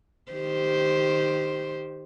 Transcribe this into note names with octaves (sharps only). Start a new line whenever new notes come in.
D#3 G4 C5